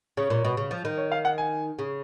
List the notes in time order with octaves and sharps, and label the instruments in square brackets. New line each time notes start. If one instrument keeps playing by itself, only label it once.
[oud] C#3 [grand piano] C#5
[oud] A#2
B2
C#3
F3
D#3
[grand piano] C#5
F5
F#5
G#5
[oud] C#3